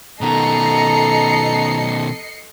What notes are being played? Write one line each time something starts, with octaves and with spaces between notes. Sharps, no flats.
B2 D#3 A4 D#5 A#5 C7 C#7